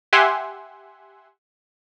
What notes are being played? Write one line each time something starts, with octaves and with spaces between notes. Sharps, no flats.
G4 E5 F#5 G#5 C6